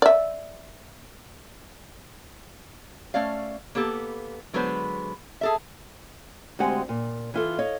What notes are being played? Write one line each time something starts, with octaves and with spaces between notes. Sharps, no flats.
D5 E5
A3 C#4 D5 F5
A#3 B3 G4 A4
D3 F#3 G#3 B3 B4 C5
G#4 A4 E5
D2 G#3 C4 G4 F#5 G#5
A#2
E3 F4 A4
C#5 D#5 F5